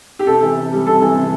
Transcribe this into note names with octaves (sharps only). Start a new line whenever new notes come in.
G4
C3 A4
E3
C3
G3
C3 A4
E3
C3